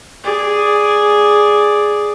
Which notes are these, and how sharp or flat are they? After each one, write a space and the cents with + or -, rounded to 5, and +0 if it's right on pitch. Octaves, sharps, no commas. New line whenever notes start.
G#4 +0 D5 +0